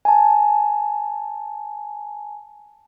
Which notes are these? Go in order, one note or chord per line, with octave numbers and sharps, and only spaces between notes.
G#5 A5